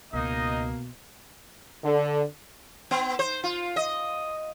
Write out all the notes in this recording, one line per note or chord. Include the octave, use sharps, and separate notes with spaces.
C#2 B2 A#3 D#4 D#5
D3
B3
C5
F4
D#5